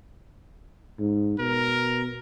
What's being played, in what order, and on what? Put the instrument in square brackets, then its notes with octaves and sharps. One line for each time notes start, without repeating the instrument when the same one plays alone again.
[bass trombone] G#2
[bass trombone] B2 [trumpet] A#4